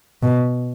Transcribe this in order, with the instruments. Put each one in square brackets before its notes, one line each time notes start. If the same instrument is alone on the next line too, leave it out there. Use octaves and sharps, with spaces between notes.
[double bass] B2